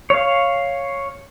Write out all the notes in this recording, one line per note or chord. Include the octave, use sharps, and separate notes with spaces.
C#5 F5